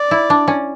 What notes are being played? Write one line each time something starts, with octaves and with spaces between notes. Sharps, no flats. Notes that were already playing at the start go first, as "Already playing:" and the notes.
Already playing: D5
E4
D4
C#4